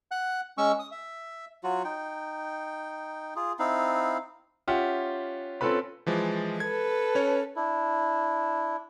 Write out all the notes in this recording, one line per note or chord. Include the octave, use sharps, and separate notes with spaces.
F#5 F#6
G#3 C#4 C#6 E6
D#6
E5
F#3 F4 F#4
D#4 G5
F4 G#4
C4 D#4 E4 F5
C#4 F4 G4 E5 F#5
C4 C#4 F4 A4 B4 B5
E3 F3 G#3
A4 B4 G#6
C#4 C#5
D4 E4